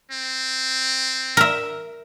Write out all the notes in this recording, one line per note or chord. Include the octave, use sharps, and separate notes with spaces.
C4
A#4 E5